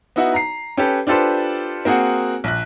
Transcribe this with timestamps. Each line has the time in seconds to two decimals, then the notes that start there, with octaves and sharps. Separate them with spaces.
0.16 B3 D#4 E4 F#4 F#5
0.34 A#5 C7
0.77 C#4 G4 A4 B4
1.07 D4 F4 G4 A4 B4 C5
1.85 A#3 C4 F#4 G#4 F#5
2.44 A#1 F#6